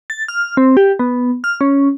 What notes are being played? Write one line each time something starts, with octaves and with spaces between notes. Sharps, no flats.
A6
F6
C4
G4
B3
F6
C#4